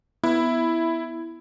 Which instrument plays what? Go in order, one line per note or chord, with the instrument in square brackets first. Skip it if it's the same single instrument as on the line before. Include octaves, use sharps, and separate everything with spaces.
[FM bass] B3 [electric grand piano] E4